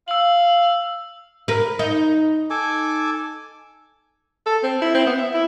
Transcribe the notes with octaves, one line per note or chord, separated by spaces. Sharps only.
F5 E6 F#7
A#4 B4
D#4
A4 G#5 D6
A4
C4
E4
C4
B3
E5
E4